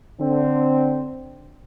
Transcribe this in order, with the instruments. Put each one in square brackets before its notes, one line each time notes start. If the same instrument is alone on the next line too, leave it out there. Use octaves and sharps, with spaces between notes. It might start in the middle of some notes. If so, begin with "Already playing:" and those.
[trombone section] D3 C4